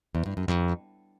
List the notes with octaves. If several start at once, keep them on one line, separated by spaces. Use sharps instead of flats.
E2
G2
F#2
F2